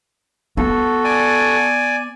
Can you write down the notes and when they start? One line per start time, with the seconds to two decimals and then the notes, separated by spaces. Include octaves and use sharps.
0.57 B3 F#4 A4
1.04 D5 G#5